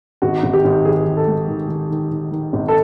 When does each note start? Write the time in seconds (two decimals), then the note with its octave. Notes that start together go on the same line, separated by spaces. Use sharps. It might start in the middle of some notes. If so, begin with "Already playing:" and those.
0.22 G#1 F#4
0.43 G#1
0.53 G4
0.65 G#1
0.85 D#3 G#4
1.06 D#3
1.17 A4
1.27 G#3
1.48 D#3
1.69 D#3
1.90 D#3
2.11 D#3
2.32 D#3
2.53 G#1
2.68 A4